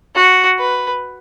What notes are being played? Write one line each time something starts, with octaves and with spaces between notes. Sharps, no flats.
F#4
B4